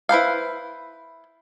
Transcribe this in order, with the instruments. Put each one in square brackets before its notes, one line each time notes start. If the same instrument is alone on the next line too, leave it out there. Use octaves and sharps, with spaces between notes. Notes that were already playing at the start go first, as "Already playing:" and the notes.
[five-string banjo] E4 B4 C5 F5